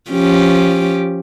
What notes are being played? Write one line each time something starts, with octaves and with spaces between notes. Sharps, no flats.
F3 C#4 G4